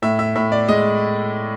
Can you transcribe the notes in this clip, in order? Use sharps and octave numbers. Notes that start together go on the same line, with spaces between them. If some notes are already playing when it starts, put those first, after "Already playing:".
A2 E5
E5
A2 E5
D5
G#3 D#5